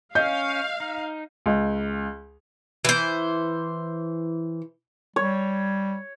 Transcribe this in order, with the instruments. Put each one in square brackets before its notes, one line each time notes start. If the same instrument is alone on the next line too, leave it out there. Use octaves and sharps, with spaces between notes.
[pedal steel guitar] C#4 [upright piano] D#5 [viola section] F5 [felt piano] G6
[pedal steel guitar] D#4
[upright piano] C#2
[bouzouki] E3 C5
[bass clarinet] G3 [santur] C#5